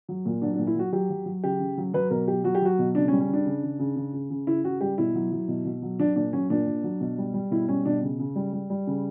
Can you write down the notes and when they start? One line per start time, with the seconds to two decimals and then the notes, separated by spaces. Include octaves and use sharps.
0.09 F#3
0.25 A#2
0.42 F#3 D4
0.54 D4
0.58 A#2
0.67 E4
0.75 F#3 F#4
0.92 F#3 G4
1.10 F#3
1.26 F#3
1.44 C#3 G4
1.60 C#3
1.78 F#3
1.94 F#3 B4
2.10 B2 A#4
2.28 F#3 G4
2.44 F#3 F#4
2.55 G4
2.62 F#3 F#4
2.79 B2
2.95 C#3 D4
3.08 C#4
3.12 G3
3.20 C#4
3.29 C#3 D4
3.46 C#3
3.63 C#3
3.79 C#3
3.96 C#3
4.13 C#3
4.30 C#3
4.47 C#3 E4
4.64 C#3 F#4
4.81 G3 G4
4.98 B2 E4
5.15 F#3
5.31 F#3
5.48 B2
5.65 B2
5.82 F#3
5.99 F#3 D4
6.16 A#2 D4
6.33 F#3 C#4
6.50 A#2 D4
6.67 A#2
6.83 F#3
7.01 B2
7.18 G3
7.34 G3
7.51 B2 E4
7.69 G3 C#4
7.86 B2 D4
8.02 C#3
8.19 C#3
8.36 G3
8.53 G3
8.70 G3
8.87 C#3